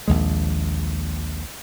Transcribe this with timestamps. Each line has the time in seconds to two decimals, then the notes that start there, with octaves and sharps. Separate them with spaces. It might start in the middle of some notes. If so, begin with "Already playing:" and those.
0.08 A#1 D#2 G#3